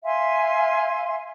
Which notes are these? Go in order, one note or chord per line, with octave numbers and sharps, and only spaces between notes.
E5 F5 G#5 C6